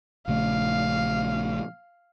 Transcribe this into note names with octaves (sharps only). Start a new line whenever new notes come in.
A#1 C#3 A3 F5